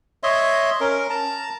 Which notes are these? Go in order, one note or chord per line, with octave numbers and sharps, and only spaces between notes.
C#5 D#5 E5 C6
C#4 A#4
A5 A#5